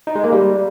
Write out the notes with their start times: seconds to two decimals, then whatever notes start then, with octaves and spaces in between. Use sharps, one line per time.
0.07 D#4
0.15 G#3
0.24 A#3
0.32 G3